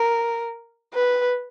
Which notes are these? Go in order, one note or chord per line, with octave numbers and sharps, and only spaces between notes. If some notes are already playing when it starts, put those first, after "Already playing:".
Already playing: A#4
B4